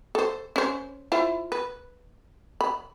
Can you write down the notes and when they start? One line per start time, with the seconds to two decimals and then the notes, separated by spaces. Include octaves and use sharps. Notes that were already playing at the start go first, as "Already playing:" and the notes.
0.15 A4 C5
0.56 C#4 C5
1.12 E4 F4 C5
1.52 B4
2.61 B5